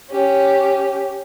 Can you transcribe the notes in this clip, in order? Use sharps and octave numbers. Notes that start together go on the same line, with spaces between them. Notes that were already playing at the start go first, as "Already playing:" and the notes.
C#4 G4